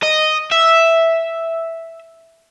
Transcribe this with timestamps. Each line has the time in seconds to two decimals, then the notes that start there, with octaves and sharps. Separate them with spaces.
0.03 D#5
0.52 E5